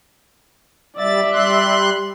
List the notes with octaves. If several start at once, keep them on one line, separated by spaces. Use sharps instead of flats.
G3 D5 E5 A6
G3 C6 F#6